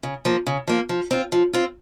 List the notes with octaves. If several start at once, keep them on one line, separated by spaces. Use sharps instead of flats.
C#3
F3 A#3
C#3
F3 A#3
F3
C4 F4
F3
C4 F4